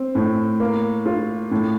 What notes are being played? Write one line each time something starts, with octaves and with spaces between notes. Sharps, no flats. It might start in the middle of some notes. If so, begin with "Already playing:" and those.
Already playing: C4
A2
A#3
F4
A2